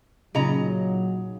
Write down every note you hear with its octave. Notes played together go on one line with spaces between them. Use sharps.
A#2 C#3 F#3 D#4 G#4 D#5 A#5